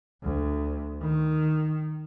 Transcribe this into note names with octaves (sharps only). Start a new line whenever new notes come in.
D2
D#3